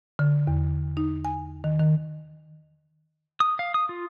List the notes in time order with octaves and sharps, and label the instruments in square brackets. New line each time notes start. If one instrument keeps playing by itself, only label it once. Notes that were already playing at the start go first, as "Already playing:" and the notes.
[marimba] D3
E2
D#4
G#5
D#3
D#3
[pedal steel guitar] D#6
F5
D#6
F4